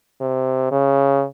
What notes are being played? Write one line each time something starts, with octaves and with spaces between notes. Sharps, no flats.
C3
C#3